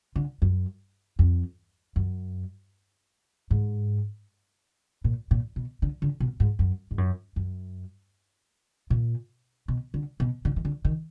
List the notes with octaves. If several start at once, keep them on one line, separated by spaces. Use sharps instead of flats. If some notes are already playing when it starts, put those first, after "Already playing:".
D3
F#2
F2
F#2
G#2
A#2
A#2
B2
D3
D3
B2
G#2
F#2
G#2
F#2
F#2
A#2
B2
D3
B2
D3
D#3
D3
D#3